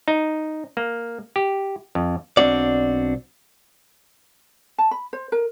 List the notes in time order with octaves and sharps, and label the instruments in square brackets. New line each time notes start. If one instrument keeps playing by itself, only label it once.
[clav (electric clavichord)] D#4
A#3
G4
F2
[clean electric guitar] B1 C4 D4 F#4 D5
[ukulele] A5
B5
C5
A#4